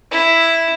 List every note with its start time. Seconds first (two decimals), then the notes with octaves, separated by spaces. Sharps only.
0.11 E4